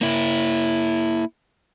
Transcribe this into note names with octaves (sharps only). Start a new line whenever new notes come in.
A#3 E4